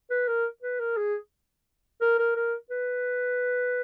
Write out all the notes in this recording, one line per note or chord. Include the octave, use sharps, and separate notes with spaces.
B4
A#4
B4
A#4
G#4
A#4
A#4
A#4
B4